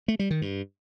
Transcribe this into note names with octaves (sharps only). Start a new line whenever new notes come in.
A3
G3
D#3
G2